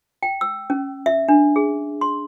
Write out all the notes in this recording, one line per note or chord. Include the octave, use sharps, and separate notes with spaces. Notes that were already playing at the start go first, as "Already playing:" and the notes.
G5
E6
C#4
E5
D4
G#4
C6